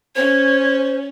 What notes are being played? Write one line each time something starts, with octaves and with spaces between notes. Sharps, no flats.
C#4 C5 C#5 G#6